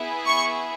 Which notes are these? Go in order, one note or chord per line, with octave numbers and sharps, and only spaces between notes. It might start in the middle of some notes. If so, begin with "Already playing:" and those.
Already playing: B3 E4 G#4
C#6